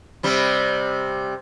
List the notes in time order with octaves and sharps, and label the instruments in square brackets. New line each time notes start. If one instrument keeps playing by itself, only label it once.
[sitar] C3 G3 C4